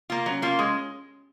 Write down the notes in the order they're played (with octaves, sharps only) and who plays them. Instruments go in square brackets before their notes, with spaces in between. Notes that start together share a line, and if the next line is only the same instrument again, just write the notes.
[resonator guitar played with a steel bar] A#3 F4
[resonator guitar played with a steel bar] F#3 [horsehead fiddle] C#4
[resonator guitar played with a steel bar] A#3 F4
G#3